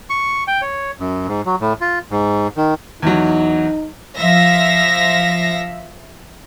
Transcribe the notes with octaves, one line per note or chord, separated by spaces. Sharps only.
C#6
G5
C#5
F#2
G#2
F#3
A2
F4
G#2
D#3
E2 F#3 D#4
F3 E5 F5 A#6